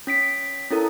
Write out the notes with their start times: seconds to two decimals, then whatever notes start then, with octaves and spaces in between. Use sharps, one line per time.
0.07 C#4 B6 D7
0.71 C#4 E4 A4 A#4